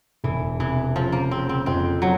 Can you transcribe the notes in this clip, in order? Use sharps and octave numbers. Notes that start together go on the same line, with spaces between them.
E1 E3
C3 E3
C#3 F3
A#3
C#3 C4
C4
F2 C4
F#3